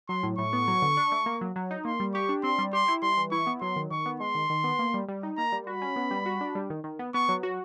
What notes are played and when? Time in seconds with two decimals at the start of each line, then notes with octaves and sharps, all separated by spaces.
0.09 F#3 C6
0.23 A2
0.38 A2 C#6
0.53 B3
0.68 F#3
0.82 D3
0.97 D4
1.12 A3
1.26 A#3
1.41 F#3
1.56 F#3
1.71 D#4
1.85 A#3 C6
2.00 G3
2.14 G4 C#6
2.29 D4
2.43 C4 C6
2.58 G3
2.73 G4 C6
2.88 E4
3.02 G3 C6
3.17 E3
3.32 E4 C#6
3.47 B3
3.61 F#3 C6
3.76 D#3
3.91 D#3 C#6
4.06 B3
4.20 G#3 C6
4.35 D#3
4.50 D#3
4.64 B3
4.79 A#3
4.94 G3
5.08 G3
5.23 D#4
5.37 A#3 A#5
5.52 G3
5.67 F#4 B5
5.82 C#4
5.96 B3
6.11 G3
6.26 F#4
6.41 D4
6.55 G3
6.70 D#3
6.84 D#3
6.99 B3
7.14 B3 C#6
7.29 F#3
7.43 F#4